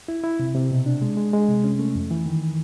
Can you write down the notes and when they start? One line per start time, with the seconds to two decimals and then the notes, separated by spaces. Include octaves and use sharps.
0.08 E4
0.24 E4
0.40 C3
0.54 C3
0.71 B2
0.86 D4
1.02 G#3
1.17 G#3
1.33 G#3
1.49 C3
1.64 C#4
1.79 A3
1.95 F2
2.11 E3
2.26 D#3